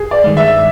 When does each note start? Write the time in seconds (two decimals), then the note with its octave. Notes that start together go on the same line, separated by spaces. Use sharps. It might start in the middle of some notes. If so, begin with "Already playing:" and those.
Already playing: G1 G#4
0.11 D5
0.24 G2 D#3 G#3
0.37 E5